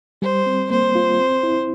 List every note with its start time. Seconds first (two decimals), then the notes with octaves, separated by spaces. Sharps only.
0.22 G3 C5
0.46 C4
0.71 A#3 C5
0.95 F4
1.20 C4
1.43 E4